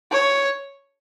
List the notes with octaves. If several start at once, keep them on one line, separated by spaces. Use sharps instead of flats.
C#5